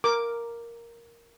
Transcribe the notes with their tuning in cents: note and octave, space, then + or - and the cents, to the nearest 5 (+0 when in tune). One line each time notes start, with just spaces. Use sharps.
A#4 +0 D6 +0